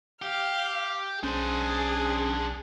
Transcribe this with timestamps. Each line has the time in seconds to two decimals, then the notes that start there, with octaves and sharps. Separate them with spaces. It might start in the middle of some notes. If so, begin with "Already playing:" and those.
0.22 G4 F5
1.23 B1 C#4 D4 G#4 C5